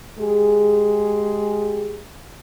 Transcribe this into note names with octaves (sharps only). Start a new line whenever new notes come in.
G#3 G4 G#4